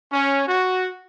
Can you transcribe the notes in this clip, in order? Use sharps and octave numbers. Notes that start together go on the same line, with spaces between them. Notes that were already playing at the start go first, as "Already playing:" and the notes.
C#4
F#4